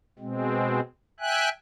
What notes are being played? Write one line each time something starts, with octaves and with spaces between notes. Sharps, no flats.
B2 G#3 C4
E5 G5 G#5 F#6